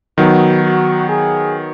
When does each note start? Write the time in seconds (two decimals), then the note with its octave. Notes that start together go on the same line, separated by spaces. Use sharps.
0.18 D#3 F#3 B3 D#4 F#4
0.63 F#4
1.08 G#4